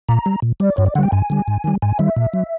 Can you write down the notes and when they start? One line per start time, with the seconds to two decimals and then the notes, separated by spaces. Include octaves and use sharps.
0.09 A#2 A#5
0.26 G3
0.42 A#2
0.60 G3 D5
0.77 G2 C#5
0.86 D5
0.95 D3 F#5
0.98 G3 G5
1.12 G2 G#5
1.30 D3 G3
1.48 G#2
1.64 D#3 G3
1.82 G#2 G#5
1.99 D#3 G3 E5
2.16 A#2
2.34 F#3